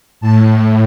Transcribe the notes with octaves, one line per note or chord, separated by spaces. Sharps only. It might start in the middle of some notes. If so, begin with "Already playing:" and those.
A2 A5